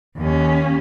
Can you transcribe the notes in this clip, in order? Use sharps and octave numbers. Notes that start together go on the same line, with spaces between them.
D#2 C#4